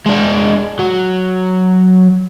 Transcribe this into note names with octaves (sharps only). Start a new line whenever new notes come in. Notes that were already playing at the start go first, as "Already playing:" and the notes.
G#3 D4
F#3